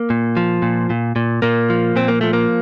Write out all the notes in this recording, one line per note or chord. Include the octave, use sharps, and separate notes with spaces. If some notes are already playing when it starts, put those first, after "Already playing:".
Already playing: A#3
A#2
F3
A#2
A#2
A#2
A#2 A#3
F3
A#2 C4
A#3
F3 A3
A#3